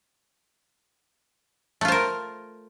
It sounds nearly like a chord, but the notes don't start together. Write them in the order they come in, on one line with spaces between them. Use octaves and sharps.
A3 F4 C5 A#4